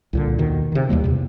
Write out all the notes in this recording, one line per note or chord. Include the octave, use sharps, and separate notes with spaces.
C2 A#2 D3
D#2 B2 D#3
C3 D#3
D#2 B2 G3 A#3
E2 C3